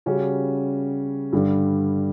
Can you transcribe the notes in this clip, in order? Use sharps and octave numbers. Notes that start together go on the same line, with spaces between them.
C#3 G3 C#4 F#4
G2 D3 G3